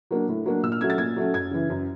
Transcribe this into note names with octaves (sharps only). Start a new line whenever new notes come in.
F#3 A#3 D4
A2
F#3 A#3 D4
A#2 E6
F6
F#3 A3 C#4 G#6
A6
A#2 G#6
F#3 A3 C#4
F#2 G#6
C#3 E3
F#2